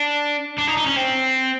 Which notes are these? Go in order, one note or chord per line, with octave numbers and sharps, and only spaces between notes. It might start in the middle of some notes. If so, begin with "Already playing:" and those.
Already playing: D4
D4
D#4
D#4
C#4
C4